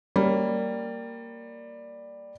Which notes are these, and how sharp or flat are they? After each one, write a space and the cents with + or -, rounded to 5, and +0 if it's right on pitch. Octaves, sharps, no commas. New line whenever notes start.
G3 +0 A#3 -10 C#5 +0